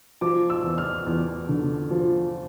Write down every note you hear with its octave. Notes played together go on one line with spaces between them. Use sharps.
F3 D6
E6
E2
F6
E2
D3
F3